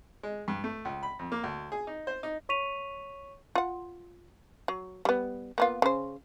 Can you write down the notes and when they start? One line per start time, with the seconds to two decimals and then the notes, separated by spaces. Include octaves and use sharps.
0.23 G#3
0.48 G2
0.64 A3
0.85 C#2
1.03 B5
1.19 F2
1.32 A#3
1.44 D2
1.72 G#4
1.87 D#4
2.07 C5
2.23 D#4
2.49 C#5 C#6 B6 D#7 F7
3.55 F4 F#5
4.68 F#3
5.05 G3 B3
5.58 A#3 B3 F4
5.82 C#3 C5